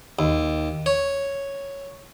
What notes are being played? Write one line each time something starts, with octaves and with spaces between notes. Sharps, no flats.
D#2
C#5